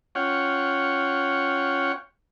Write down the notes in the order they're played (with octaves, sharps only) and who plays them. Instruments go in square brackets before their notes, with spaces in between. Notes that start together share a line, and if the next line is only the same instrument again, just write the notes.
[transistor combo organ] C#4 F4 C#5 F#5 G5